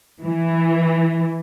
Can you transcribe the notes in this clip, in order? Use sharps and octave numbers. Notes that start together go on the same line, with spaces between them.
E3